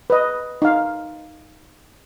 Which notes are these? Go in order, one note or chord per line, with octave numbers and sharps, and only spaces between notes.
B4 D#5
D#4 F5